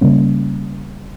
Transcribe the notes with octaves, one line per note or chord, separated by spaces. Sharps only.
C#3 G3 A#3 C#4